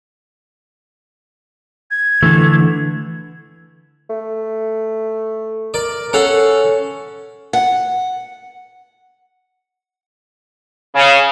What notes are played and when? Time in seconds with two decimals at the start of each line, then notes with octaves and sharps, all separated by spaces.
1.91 G#6
2.23 D3 E3 A3
4.10 A3
5.74 A#4 D5
6.13 C#4 A4 F5 F#5
7.53 F#5
10.94 C#3